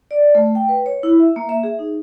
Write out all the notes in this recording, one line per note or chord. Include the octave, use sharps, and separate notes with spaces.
D5
A3
G5
B4
C#5
E4
E5
A#3
E5
G#4
D#4